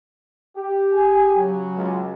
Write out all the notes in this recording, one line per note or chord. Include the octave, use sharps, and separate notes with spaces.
G4
G#4 G#5
C#3 F#3
C#2